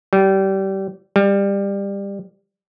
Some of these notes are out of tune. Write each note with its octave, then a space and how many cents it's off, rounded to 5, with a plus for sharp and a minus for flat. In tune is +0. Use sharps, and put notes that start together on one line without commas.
G3 -25
G3 +20